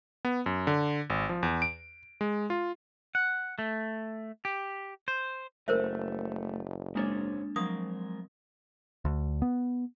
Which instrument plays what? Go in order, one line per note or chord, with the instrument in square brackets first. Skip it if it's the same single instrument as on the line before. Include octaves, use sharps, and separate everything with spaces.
[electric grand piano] B3
F#2
D3
G#1
F3
E2
D7
G#3
F4
[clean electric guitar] F#5
A3
G4
C5
[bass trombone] F#1 [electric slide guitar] A3 [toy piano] A#4 C5 E5
[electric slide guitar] G#2 C4 C#5 [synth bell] G#3 A#3 D4
[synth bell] F3 F#3 [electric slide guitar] G#3 C4 A#4 [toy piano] D#6
[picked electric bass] D2
B3